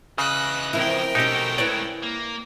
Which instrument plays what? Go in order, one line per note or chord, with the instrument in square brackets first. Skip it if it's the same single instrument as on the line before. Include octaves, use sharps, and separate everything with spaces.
[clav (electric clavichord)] C#3 [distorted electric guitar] E3 D#5 [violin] E6 F#6
[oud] F3 C4 E4 [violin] A#4 G5
[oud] B2 C#4 [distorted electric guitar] G#3 A3 [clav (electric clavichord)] D#4 G4
[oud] E4 B4 C#5 [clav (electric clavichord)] D5
[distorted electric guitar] A#3